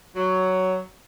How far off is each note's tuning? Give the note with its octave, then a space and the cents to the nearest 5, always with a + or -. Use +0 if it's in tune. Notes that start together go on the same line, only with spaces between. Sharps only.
F#3 +10